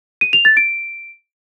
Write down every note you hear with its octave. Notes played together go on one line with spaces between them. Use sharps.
D#7
F7
A6
D7